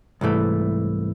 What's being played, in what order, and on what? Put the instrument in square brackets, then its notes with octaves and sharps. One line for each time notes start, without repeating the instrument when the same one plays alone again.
[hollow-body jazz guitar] C2 G#2 E3 A3